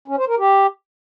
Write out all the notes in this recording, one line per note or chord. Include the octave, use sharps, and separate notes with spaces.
C#4
C5
A#4
G4